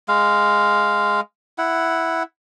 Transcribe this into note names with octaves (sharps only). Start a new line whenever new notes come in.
G#3 F5
E4 F#5